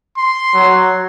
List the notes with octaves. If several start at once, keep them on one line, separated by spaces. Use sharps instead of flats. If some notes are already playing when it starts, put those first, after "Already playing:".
C6
F#3